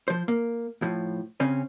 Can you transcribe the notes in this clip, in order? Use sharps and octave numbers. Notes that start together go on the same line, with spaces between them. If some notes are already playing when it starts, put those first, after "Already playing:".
F3 C5
A#3
A2 F3
C#3 C4 C#4